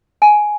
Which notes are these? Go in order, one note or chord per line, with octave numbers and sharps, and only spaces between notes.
G#5